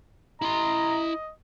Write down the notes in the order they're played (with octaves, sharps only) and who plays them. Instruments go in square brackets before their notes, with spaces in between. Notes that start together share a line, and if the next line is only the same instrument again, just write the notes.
[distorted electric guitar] E4 C6 [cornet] D#5 [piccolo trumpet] A#5